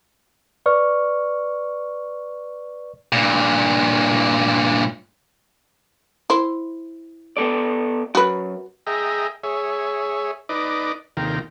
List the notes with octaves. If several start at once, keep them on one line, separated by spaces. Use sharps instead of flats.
B4 D5 C#6 F6
G2 A#2
E4 C5
B3 A4 D5
F#2 F#4 B4
G#4 D#5 E5 G5 A#5
G#4 C#5 E5
D#4 B4 D5 D#5 D6
D#2 C3 D#3 F4 G5 A#5